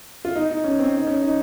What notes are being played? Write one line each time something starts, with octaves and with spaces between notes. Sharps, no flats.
F4
D#4
D#4
C#4
C4
D#4
C#4
D#4